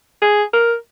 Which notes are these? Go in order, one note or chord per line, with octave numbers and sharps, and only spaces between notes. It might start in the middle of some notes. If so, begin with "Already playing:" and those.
G#4
A#4